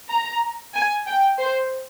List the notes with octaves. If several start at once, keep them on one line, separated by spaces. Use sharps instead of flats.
A#5
G#5
G5
C5